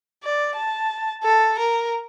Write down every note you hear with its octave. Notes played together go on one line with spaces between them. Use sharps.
D5
A5
A4
A#4